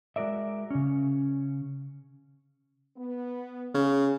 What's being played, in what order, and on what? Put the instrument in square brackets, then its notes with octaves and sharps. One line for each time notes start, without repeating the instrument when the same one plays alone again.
[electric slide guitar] G#3 F#4 A#4 D5 E5
C#3 C#4
[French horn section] B3
[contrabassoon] C#3 [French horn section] G#4